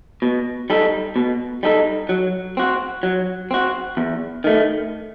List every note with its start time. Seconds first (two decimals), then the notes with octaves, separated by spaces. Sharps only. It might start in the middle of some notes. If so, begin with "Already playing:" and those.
0.22 B2
0.70 G3 D#4 A4
1.16 B2
1.63 G3 D#4 A4
2.09 F#3
2.57 C4 F#4
3.03 F#3
3.51 C4 F#4
3.97 E2
4.44 D#3 A3